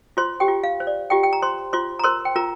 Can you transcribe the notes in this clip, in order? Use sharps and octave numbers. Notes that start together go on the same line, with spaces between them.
F4 C5 C6
G4 G5
F4
F5
C5
D5
F4 G4 G5
G5
A#5
C5 C6
F4 C5 C6
A#5
A#4 C5 C6
G5
F4 A#4 A#5